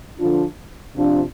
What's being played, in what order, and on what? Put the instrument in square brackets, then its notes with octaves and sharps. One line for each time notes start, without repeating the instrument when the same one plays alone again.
[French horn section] D3 F3 D4 F4
C3 F3 D4 F4